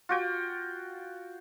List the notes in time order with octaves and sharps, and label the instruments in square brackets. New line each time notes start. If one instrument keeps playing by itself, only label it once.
[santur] F4 F#4 G5